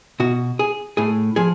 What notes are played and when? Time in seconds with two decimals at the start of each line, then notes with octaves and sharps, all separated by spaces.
0.20 B2 F#4
0.59 G#4
0.97 A2 G#4
1.36 F3 G#4